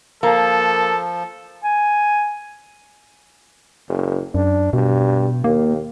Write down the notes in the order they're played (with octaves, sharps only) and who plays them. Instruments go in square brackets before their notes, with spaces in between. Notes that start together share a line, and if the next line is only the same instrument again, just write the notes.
[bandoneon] F3 [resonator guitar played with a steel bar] A#3 [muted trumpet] A4
[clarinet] G#5
[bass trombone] F#1
[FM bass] F#2 [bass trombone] D4
[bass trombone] G2 [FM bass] B2
[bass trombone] D#2 [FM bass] A#3